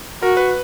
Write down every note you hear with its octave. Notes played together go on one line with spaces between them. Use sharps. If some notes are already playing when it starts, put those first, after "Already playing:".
F#4 A#4
B4